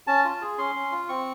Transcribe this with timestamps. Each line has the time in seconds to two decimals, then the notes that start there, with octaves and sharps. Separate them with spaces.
0.07 C#4 A5
0.25 F4
0.41 G#4
0.58 C#4 C6
0.75 C#4
0.92 F4
1.09 C4 C#6